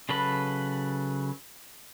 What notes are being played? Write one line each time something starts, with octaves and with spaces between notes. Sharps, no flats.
C#3 F#3 A4 B4 B5